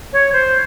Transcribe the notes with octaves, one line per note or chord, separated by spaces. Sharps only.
C#5
C5